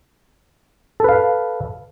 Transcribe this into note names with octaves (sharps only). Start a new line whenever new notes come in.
A4 B4 F5